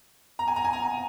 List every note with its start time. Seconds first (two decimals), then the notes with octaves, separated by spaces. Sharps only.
0.39 A#5
0.48 G#5
0.56 A#5
0.64 G#5
0.73 A#5